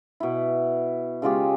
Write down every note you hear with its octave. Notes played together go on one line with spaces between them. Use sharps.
B2 E4
C#3 G#3 F4 G4